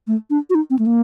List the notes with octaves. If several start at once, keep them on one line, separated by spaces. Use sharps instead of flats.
A3
D4
F#4
D#4
C4
A3
A#3